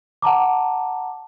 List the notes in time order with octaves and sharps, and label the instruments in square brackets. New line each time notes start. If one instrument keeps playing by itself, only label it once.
[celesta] F#5 A5 A#5 D6